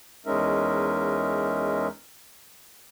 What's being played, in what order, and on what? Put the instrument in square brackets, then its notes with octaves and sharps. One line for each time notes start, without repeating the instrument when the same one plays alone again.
[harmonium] E2 G#3 C#4 D#4 A#4 E5